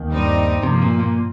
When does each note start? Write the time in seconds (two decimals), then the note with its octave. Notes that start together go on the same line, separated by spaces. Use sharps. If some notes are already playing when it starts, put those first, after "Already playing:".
Already playing: D#2 D#3
0.09 G2 G3 C4 D#4
0.63 G2 C3 F3 A#3
0.82 A#2
1.00 A#2